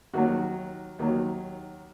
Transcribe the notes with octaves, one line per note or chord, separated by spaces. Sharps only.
D#2 D#3 F#3 F#4
D#2 D#3 F#3